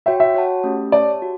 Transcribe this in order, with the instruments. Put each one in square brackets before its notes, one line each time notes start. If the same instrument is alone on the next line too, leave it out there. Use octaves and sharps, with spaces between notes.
[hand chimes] F#4 C#5 G5 [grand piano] E5
[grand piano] E5
[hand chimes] F#4 C#5 F#5 A5
A3 C#4 G4
[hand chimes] G4 C#5 E5 A5 [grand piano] D5
[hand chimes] F#4